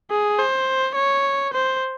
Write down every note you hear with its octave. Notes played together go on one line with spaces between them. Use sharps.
G#4
C5
C#5
C5